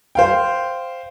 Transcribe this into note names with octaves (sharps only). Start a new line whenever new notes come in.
C5 F5 G5